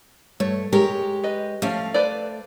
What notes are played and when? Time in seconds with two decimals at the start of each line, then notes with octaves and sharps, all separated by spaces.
0.40 G2 A3 C#5
0.72 G#3 G4 A#4 C#5
1.24 B4 D#5
1.62 F3 A3 C#4 F5
1.94 B4 C5 D5